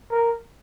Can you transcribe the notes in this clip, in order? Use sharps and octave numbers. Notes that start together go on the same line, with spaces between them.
A#4